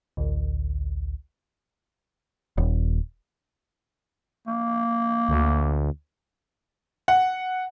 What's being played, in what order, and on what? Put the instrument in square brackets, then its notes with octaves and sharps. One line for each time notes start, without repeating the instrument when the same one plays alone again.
[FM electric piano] A1 D2
[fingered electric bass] D#1
[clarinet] A#3
[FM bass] D2
[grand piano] F#5